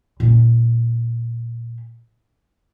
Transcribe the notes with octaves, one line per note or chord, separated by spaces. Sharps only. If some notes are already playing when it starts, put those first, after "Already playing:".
A#2 C#4